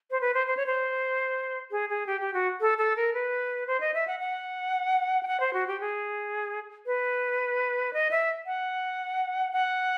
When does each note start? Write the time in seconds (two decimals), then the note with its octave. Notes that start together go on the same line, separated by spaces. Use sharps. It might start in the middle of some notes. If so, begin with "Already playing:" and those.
0.11 C5
0.21 B4
0.34 C5
0.47 C5
0.57 C#5
0.66 C5
1.71 G#4
1.89 G#4
2.06 G4
2.21 G4
2.34 F#4
2.61 A4
2.78 A4
2.96 A#4
3.14 B4
3.67 C5
3.80 D#5
3.94 E5
4.07 F#5
4.20 F#5
5.23 G5
5.27 F#5
5.40 C5
5.53 F#4
5.67 G4
5.80 G#4
6.86 B4
7.93 D#5
8.11 E5
8.46 F#5
9.53 F#5